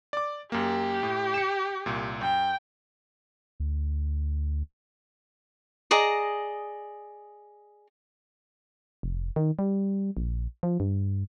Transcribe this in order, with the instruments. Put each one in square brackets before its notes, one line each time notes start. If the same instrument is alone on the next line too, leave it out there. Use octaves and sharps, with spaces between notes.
[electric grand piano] D5 D6
[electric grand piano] F#2 A#3 [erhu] G4
[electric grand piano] A2
C#7 E7
C2 A#2
[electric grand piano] F#2 [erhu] G5
[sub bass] D2
[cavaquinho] G#4 D5 D#5 A#5
[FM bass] F1
D#3
G3
A#1
F3
G2